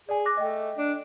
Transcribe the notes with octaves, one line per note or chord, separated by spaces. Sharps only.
G#4 D5 G#5
D6 F#6 A#6
A3 D#5 G5
D4